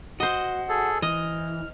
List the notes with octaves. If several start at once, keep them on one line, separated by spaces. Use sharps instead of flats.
F#4 C5 D#5
G#4 A4
E3 D#5 F6